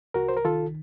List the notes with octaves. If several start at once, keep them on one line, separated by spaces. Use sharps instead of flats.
C2 F#4 A#4
C5
A#4
D#3 F4 A4